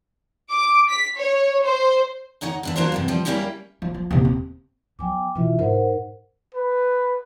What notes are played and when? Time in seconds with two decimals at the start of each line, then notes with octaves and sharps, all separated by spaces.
0.49 D6
0.89 B6
1.18 C#5
1.62 C5
2.41 D2 D#4 C#5 F#5
2.63 E2 D4 E5
2.76 F#3 A#3 D4 F4 C5
2.92 E2 G2 C3
3.08 F3 G3
3.25 G3 A#3 C4 C#4 E4 G4
3.82 F3
3.94 F3
4.11 D#1 C3
4.25 C4
4.99 F#3 B3 G5 G#5 D6
5.35 B2 E3 E4 F4 E5
5.59 G#2 A#4 C5 F#5
6.55 B4